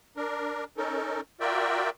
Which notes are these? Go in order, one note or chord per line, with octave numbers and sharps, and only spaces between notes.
D4 A#4
C#4 D#4 A4 A#4
F4 F#4 A#4 D5 E5 G5